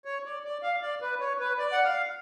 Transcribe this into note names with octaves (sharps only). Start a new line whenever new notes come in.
C#5
D5
D5
F5
D5
B4
C#5
B4
D5
F#5
F5